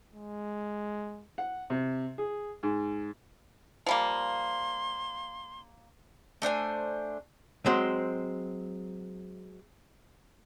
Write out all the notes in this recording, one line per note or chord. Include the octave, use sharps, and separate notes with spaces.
G#3
F#5
C3
G#4
G#2
F3 G3 A#3 C6
A3 D4 C5 G#5
F#3 G#3 C4 C5